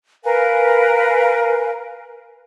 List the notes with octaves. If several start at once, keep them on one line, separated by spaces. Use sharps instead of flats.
A#4 B4 F5 G#5